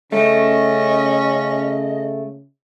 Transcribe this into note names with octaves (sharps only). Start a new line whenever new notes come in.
C#3 A3 C#4 D#5